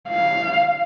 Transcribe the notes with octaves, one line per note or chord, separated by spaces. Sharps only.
F5